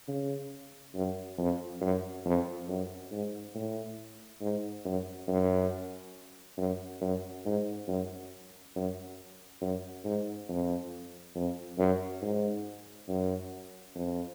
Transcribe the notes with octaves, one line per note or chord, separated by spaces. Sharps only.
C#3
F#2
F2
F#2
F2
F#2
G#2
A2
G#2
F#2
F#2
F#2
F#2
G#2
F#2
F#2
F#2
G#2
F2
F2
F#2
G#2
F#2
F2